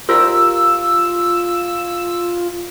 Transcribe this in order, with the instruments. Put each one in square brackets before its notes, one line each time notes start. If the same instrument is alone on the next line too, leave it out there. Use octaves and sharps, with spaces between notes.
[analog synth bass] F4 [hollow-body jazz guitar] G4 A#4 C5 [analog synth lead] E6